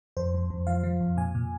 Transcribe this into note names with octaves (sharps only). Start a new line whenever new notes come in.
F2 C5
F2
F2
F3 F5
F3
F2
A#2 G#5
A#2